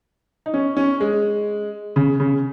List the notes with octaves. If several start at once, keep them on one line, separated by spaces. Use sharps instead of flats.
D#4
C#4
C#4
G#3
C#3
C#3